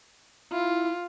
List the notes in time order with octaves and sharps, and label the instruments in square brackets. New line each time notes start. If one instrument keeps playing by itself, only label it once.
[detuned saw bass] E4 [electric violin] F4